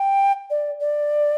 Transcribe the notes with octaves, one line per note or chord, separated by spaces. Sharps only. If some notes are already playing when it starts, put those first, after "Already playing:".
Already playing: G5
D5
D5